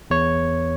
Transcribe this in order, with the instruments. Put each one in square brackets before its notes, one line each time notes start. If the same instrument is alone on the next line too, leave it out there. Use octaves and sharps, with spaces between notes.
[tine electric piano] E2 C#5